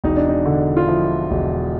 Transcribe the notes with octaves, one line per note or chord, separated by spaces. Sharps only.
E1 D#4
D4
D#4
D3
F4
F3 E4
E1